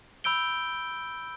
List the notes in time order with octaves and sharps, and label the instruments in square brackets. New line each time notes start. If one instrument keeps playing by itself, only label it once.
[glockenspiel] B5 E6 G6 D7 G7